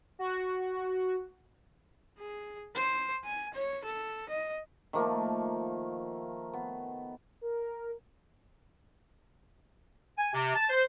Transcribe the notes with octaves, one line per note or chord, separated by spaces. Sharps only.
F#4
G#4
C5
G#5
C#5
A4
D#5
D#3 F3 A3 A#3
B3
A#4
G#5
C3
A5
C5